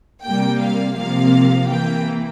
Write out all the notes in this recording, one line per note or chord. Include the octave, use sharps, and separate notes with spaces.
C3 G3 A#3 G5
F5
C3 F3 A#3 F5
E3 A#3 G5